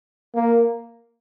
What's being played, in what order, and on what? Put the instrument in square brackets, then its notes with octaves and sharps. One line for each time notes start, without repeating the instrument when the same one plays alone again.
[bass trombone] A#3